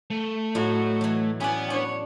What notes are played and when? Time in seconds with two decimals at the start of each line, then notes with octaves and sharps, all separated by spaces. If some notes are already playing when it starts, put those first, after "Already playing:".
0.10 A3
0.55 A2 F#3 D#4 F#4
1.01 E3 F#3
1.40 B3 C#4 D5 F#5 G#5
1.70 D4 C#5